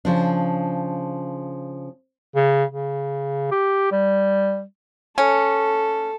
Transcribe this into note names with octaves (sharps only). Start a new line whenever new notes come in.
C#3 F3 D4
C#3
C#3
G4
G3
C#4 A4